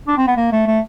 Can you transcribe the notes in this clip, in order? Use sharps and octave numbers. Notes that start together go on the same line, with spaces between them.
D4
C4
B3
A#3
A3
A3